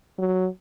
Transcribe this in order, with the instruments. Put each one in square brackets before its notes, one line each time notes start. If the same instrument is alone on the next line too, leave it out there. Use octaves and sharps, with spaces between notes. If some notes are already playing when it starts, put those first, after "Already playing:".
[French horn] F#3